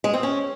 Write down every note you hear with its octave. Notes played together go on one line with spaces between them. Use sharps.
G#3
C4
C#4